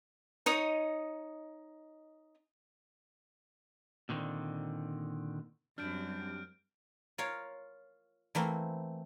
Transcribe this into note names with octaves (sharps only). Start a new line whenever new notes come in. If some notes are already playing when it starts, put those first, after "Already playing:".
D#4 C#5 D#5 D#6
A#2 D3 D#3 C4
F#2 G3 C4 D4 F6 G6 D7
F4 A#4 C#5 F5
E3 A3 A#3 C4